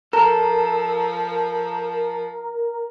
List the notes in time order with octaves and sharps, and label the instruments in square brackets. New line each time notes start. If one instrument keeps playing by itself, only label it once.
[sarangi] F3 [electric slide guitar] A4 [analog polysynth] A#4 [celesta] A#5